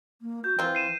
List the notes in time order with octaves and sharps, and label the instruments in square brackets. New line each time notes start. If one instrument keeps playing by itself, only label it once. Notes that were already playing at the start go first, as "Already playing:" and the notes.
[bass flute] A#3
[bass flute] F#4 [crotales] G6
[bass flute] E3 [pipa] C4 F4
[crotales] C7 D#7 E7